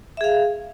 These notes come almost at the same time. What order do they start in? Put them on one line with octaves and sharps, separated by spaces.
E5 G#4 F5